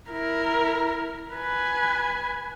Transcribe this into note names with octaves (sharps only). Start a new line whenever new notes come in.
E4 A#4
B4 G#5